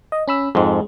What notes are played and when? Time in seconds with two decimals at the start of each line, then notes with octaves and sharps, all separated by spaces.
0.12 D#5
0.28 C#4 B5 E6
0.55 F2 G#2 G#3